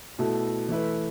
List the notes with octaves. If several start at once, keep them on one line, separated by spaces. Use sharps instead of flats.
B2 A3 E4 A4
E3 A3 E4 B4